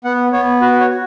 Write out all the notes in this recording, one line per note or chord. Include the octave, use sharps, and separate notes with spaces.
B3 F#5
B3 C#5
F#4 B4
C#5
F#4